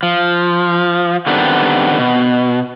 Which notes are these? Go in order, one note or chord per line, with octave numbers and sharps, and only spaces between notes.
F3
D3 D#3 G3 B3 C4 D4
B2